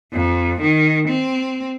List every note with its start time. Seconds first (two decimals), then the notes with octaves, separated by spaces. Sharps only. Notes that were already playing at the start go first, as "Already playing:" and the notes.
0.13 F2
0.61 D#3
1.08 C4